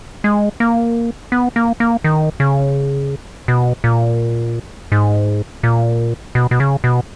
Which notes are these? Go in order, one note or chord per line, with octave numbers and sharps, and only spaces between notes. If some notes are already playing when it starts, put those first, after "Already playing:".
G#3
A#3
B3
A#3
A#3
D#3
C#3
B2
A#2
G#2
A#2
B2
B2
C#3
B2